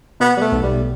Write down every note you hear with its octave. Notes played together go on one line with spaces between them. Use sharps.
B2 B3
G3
A3
B1
G3